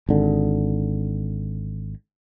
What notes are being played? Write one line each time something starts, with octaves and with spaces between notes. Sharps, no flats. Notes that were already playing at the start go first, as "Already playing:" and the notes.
G#1 D3